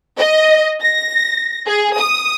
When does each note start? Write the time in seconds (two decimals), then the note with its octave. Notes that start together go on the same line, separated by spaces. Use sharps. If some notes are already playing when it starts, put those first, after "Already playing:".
0.18 D#5
0.81 A#6
1.67 G#4
1.99 D#6